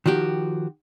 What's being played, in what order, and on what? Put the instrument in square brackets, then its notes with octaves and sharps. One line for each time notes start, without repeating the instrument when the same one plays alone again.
[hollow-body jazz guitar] D#3 F3 F#4 G4